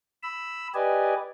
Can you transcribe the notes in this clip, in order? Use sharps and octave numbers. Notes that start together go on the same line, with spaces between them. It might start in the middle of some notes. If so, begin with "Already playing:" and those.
B5 E6
G4 B4 D5 D#5 G#5